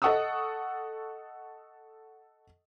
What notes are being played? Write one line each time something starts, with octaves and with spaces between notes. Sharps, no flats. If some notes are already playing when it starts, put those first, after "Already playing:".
A4 D#5 F#5 C#6 D#6 E6